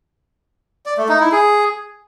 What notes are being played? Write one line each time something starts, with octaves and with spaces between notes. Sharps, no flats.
D5
A3
D#4
E4
G#4